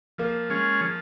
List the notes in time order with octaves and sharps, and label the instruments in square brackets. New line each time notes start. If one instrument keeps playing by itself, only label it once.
[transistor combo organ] F3 [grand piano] A#3
[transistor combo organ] G#3 C#4 F4 G#4
F3